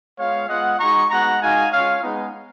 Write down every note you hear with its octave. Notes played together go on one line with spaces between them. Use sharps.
G#3 B3 F4 C#5 F5
G#3 B3 F4 D#5 F#5
G#3 D#4 F#4 A#5 C#6
G#3 B3 D#4 F#4 F#5 A#5
G#3 D#4 F#4 F5 G#5
G#3 C#4 F4 C#5 F5
G#3 B3 D#4